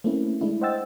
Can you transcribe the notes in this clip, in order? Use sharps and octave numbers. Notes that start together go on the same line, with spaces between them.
A3 A#3 C4 C#4 E4
G#3 A3 D4 E4
C5 D#5 F#5 G5 E6 A6